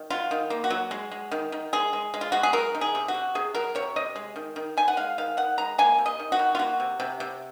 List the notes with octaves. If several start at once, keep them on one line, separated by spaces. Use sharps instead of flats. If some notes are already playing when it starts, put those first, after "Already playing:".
Already playing: D#3
F#3 F4
D#3
A#3
F#4
F#3
G#3
G#3
D#3
D#3
G#3 G#4
G#3
G#3
F4
G#3 F#4
G#4
F#3 A#4
D#3
G#4
C3
F#4
C3
C3 G#4
F#3 A#4
C3 C#5
C3 D#5
G#3
D#3
D#3
D#3 G#5
F#5
G#3 F5
D#3 F5
D#3 F#5
G#3 A#5
A#3 G#5
C3
D#5
D#3
F#4
D#3
F4
A#3 F#4
C3
C3
C3